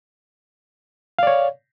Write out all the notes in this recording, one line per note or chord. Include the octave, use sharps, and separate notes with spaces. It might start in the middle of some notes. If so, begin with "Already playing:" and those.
C#5 D5 F5